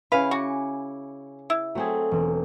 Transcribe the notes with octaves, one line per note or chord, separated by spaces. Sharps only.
C#3 E4 B4 F5
F#4 G#5 D6 C#7
E4
F#3 A3 C4 G#4
E1